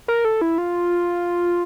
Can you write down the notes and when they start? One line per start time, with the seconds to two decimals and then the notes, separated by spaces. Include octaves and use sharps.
0.08 A#4
0.25 A4
0.41 E4
0.58 F4